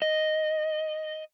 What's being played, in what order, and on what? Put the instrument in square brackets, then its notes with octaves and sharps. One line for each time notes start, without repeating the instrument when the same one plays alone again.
[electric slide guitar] D#5